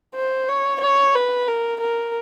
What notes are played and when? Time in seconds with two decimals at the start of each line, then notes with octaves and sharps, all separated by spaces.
0.15 C5
0.49 C#5
0.81 C#5
1.15 B4
1.48 A#4
1.81 A#4